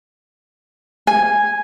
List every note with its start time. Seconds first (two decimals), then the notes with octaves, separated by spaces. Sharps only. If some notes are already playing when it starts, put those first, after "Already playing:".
1.07 G#5